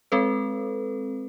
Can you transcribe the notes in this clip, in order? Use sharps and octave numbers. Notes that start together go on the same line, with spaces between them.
G#3 C4 A4 B4